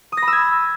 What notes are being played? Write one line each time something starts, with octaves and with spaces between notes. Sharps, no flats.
D#6
A#6
B5
E6
G#6